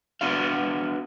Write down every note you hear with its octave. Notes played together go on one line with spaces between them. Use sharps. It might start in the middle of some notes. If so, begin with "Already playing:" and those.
B3 D4 F#4 F5